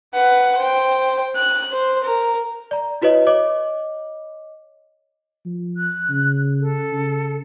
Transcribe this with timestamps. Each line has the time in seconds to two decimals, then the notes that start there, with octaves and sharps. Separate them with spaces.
0.14 B4 F#5
0.58 C5 G5
1.36 F#6
1.71 C5
2.04 A#4
2.71 D5 A#5
3.02 E4 F#4 B4 C#5 D#5
3.27 C#5 D#5 D6
5.45 F3
5.77 F#6
6.09 C#3
6.60 A4
6.93 C#3